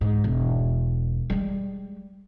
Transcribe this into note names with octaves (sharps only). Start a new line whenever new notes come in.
G#2
E1
G3 G#3